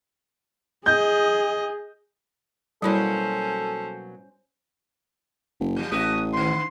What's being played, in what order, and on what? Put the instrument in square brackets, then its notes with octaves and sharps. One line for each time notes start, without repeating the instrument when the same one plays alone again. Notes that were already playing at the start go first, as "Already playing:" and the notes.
[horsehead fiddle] G#4 [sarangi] D#5 [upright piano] G6
[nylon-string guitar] B2 F#3 A#3 [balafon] G3 E4 [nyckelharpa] C#4 C5 [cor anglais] A4
[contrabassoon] F#1
[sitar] E3 G3
[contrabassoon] A1 [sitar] G#3 F#4 G4 [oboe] D#6
[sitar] D3 E3 [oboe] C6